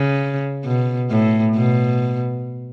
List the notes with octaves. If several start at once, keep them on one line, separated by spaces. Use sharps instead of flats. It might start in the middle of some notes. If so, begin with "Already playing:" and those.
Already playing: C#3
B2
A2
B2